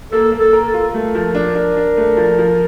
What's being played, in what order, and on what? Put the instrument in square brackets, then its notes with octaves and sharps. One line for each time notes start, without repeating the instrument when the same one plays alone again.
[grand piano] A#3 [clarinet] A4
[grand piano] A#3
[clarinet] A4
[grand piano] A#4
[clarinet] A4
[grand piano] F4
[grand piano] A3 [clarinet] A#4
[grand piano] F3
D4
D4
D4
A3
F3
F3